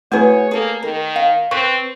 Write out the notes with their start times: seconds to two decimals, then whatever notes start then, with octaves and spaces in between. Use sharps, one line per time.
0.12 A3 E4 F#4 G#4 B4 C#5
0.51 A#3 G#4 A4
0.83 D#3 A#4
1.16 F5
1.51 C4 B4 C#6